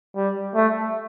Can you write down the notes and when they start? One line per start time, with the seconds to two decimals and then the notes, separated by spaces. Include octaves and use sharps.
0.16 G3
0.55 A3